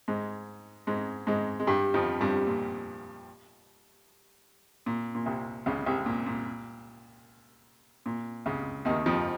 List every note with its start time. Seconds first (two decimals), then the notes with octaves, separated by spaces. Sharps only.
0.08 G#2 G#3
0.87 G#2 G#3
1.27 G#2 G#3
1.60 G#3
1.67 G2 G3
1.94 F2 F3
2.21 G2 G3
2.47 A#2
4.86 A#2
5.15 A#2
5.26 C2 C3
5.66 C#2 C#3
5.86 C2 C3
6.06 A#2
6.26 A#2
8.06 A#2
8.46 C#2 C#3
8.85 D#2 D#3
9.06 F2 F3